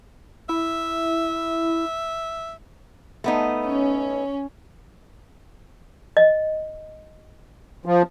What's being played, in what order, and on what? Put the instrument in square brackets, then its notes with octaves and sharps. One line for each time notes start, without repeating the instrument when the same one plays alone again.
[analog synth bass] E4 [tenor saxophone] E5
[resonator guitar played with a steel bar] A3 B3 D#4
[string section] C#4
[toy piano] D#5
[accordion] F3